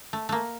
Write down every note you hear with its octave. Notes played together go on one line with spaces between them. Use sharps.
A3
A3 A#3